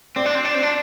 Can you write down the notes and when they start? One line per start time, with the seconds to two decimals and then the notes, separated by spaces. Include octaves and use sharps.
0.16 C4 D5
0.26 D4
0.35 C4
0.45 D4
0.55 C4
0.63 D4